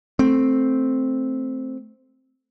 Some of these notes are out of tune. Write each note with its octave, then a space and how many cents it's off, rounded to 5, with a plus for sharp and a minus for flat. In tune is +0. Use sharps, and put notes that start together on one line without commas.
A3 +0 C4 +0